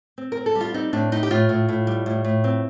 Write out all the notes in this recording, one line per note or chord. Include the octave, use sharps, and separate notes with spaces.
C4
A#4
C4
A4
G3
F4
C4 D#4
A2 D4
A2 D#4
G4
A2 F4
A2
A2
G3
A2
A2
C4